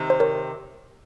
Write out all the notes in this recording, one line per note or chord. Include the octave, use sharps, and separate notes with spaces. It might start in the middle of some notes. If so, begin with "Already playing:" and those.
Already playing: C3 D#3
C5
A#4 C#5